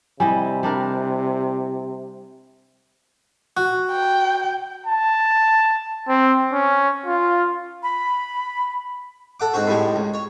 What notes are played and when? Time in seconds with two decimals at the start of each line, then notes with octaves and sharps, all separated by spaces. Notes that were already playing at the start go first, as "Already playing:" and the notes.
0.20 C3 G3 E4 D#5 G#5
0.63 G3 D4 A#4
3.57 F#4
3.91 G5
4.86 A5
6.08 C4
6.53 C#4
7.06 F4
7.83 B5
9.40 A4 F#5 D6
9.54 G#2 C4 F#4
9.67 A2 G3 G#3
9.96 C#2
10.14 C#5